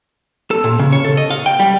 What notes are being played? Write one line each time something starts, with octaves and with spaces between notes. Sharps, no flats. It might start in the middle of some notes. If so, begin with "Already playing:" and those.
A4
A#2
C#3
C#5
A4
D#5
F5
G5
G3